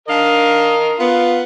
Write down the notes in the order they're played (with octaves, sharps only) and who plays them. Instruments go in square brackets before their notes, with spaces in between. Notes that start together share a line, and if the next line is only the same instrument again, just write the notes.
[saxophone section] D4 F5 [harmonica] A#4 D#5
[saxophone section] B3 [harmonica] F4